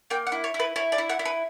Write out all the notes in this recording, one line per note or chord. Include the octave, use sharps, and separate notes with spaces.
A#3 G5
F#5
E4
C#5
E4
B4
E4 C#5
D5
E4
F#5
E4
B4